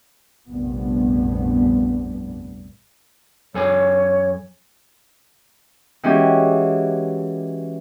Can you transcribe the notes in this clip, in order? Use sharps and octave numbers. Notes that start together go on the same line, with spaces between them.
F1 A#1 G2 B3
F#2 A4 C#5 G#5
E3 G#3 C#4 F#4 G4